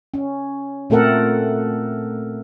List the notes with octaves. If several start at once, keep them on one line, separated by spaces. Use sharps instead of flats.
C#4
A#2 A3 C4 A4 A#4 F#5